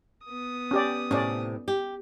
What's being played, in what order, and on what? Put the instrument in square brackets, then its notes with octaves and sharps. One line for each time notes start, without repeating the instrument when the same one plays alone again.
[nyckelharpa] B3 D#6
[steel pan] C#4 G4 D5
[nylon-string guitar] A2 C3 [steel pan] C#4 D5
[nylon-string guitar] G4